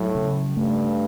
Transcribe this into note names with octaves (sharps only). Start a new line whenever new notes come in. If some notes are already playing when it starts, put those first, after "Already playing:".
Already playing: A2 F#3
C#3
G2 A3